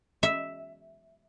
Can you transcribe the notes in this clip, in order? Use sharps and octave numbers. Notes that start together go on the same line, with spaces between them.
E5